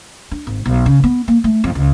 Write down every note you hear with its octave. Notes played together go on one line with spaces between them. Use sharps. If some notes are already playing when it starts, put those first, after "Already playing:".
D4
G#1
B1
C#3
B3
A#3
A3
F2
C#2